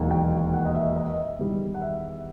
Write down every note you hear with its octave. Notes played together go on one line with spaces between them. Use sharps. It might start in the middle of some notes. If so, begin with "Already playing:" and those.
Already playing: E1 D#2 D#3 F#3
G5
F#5
D#5
E5
D#5
E5
E2 D#3 G3
F#5
E5